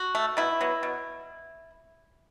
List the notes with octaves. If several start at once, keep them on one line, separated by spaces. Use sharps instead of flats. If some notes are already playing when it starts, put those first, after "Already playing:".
Already playing: F#4
A3
B2 E4
F#3 B3
B2